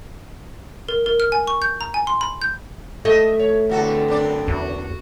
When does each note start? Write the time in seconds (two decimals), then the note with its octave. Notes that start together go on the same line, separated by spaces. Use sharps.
0.89 A#4
1.06 A#4
1.20 F6
1.32 G#5
1.47 C#6
1.62 G6
1.81 A#5
1.94 G#5
2.07 C6
2.21 B5
2.42 G6
3.05 A3 D#5 E5
3.39 C#5
3.69 E2 D3 B3 C4 F#4 A4
4.08 F#2 D4 D5
4.48 E2 F#4